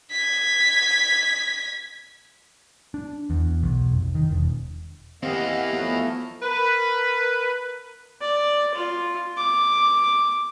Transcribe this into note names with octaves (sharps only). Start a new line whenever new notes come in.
G#6 B6
D4
E2
B1
F1
D#3
E1
E2 E3 A#3 C4 G4 D#5 F5 F#5
F3 F#3 A3 B3
A#4 B4
D5
F4
D6